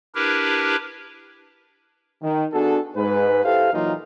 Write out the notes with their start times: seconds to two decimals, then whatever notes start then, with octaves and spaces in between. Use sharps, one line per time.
0.15 D4 E4 G4 A#4 B4
2.23 D#3
2.53 B3 D4 F#4 G#4 A4
2.96 G#2 B4
3.45 E4 G4 A4 C5 F5
3.73 A#2 E3 F#3 A#3 D#4 F4